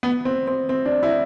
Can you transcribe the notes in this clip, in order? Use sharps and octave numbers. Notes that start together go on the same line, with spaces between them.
B3
C4
C4
C4
D4
E4